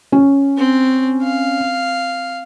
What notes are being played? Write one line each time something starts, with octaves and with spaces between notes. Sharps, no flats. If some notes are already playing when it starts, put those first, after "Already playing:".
C#4
C4
F5